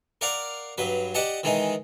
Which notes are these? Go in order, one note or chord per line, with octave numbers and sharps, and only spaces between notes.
A#4 D5 F5 F#5
G2 F#3 B4
G4 D5 D#5 F#5 A5
D#3 E3 G#3 D#4